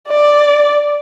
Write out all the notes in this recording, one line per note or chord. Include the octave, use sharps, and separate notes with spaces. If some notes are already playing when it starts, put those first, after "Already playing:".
D5